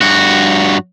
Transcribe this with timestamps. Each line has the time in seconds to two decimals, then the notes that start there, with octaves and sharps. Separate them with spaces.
0.01 G2 F#4